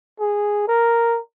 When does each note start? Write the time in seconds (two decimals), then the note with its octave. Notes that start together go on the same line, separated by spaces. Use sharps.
0.20 G#4
0.68 A#4